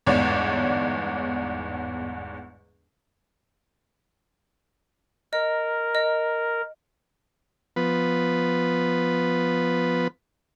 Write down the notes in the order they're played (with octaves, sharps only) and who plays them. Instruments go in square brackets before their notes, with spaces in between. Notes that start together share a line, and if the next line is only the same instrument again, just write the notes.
[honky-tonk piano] G1 E2 G#2 C#5 D5
[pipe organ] A#4 [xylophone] D#5
[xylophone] D#5
[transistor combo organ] F3 B3 B4